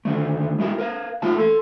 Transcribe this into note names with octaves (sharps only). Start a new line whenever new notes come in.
D3 D#3 A3
G#3 E4 F#4 A#4
A#4 B4 F5
A3 F4 E5 A5
A4 C6